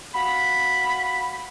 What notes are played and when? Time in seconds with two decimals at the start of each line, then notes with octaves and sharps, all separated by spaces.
0.15 F#4 F5 B5